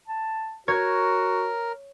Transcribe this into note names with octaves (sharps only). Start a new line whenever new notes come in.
A5
F#4 A#4 C#5 G#6